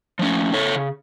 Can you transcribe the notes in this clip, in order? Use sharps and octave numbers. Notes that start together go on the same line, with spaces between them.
F3 A3 C#4
C#3 A4 C#5